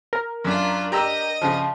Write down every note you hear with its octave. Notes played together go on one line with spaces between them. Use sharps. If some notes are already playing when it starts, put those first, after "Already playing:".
A#4
F#2 D4 F4
G4 D#5 A#5 E6
C#3 F3